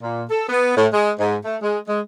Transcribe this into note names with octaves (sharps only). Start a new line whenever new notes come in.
A#2
A4
B3
A2
G#3
G#2
A3
G#3
G#3